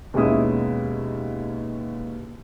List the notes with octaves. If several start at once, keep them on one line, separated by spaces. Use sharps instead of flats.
D#2 B2 G#3 C#4 E4 D#6